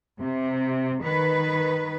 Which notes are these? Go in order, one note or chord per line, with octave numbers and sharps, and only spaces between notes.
C3
D#3 B4